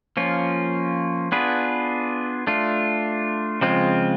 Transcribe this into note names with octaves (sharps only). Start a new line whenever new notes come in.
F3 A#3 C#4 F4
B3 D4 F4 G#4 B4
A3 D4 F4
C#3 F3 G#3 C4 F4